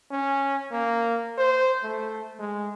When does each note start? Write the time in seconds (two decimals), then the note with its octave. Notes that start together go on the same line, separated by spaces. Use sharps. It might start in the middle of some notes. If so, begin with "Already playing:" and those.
0.11 C#4
0.72 A#3
1.38 C5
1.83 A3
2.40 G#3